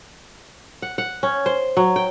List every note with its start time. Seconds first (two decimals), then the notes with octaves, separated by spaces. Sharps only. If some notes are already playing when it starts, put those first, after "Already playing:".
0.82 F#5
0.98 F#5
1.23 C#4
1.46 C5
1.77 F#3
1.96 G5